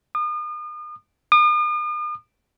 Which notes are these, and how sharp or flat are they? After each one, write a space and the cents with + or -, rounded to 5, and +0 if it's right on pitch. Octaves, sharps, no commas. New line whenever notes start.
D#6 -40
D#6 -45